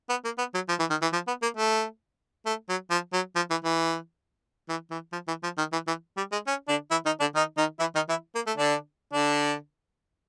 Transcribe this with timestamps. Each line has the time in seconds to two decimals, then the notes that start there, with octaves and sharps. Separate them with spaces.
0.10 B3
0.25 A#3
0.38 B3
0.54 F#3
0.69 F3
0.79 E3
0.90 D#3
1.02 E3
1.13 F3
1.27 B3
1.42 A#3
1.57 A3
2.46 A3
2.69 F#3
2.90 F3
3.13 F#3
3.36 F3
3.50 E3
3.64 E3
4.69 E3
4.91 E3
5.13 F3
5.28 E3
5.43 F3
5.58 D#3
5.72 E3
5.87 E3
6.17 G3
6.32 G#3
6.47 C#4
6.68 D3 D4
6.91 E3 E4
7.05 D#3 D#4
7.20 D3 D4
7.35 D#3 D#4
7.57 D#3 D#4
7.79 E3 E4
7.95 D#3 D#4
8.09 E3 E4
8.35 A#3
8.47 A3
8.58 D3 D4
9.13 D3 D4